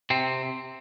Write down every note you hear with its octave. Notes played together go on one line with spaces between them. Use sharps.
C3 C4